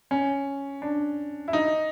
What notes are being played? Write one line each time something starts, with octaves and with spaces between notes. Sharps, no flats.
C#4
D4
E4
D#4